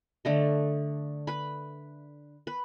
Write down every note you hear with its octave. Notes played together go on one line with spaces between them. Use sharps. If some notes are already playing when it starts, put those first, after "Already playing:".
D3 A3 D#5
B4 B5
B4